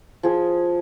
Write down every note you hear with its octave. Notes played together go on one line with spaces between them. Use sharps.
F3 G#4